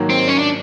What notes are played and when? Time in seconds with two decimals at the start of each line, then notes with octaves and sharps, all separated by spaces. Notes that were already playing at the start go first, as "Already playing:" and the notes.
Already playing: G#2 D#3 F#3 A#3
0.10 C4
0.28 C#4
0.38 D4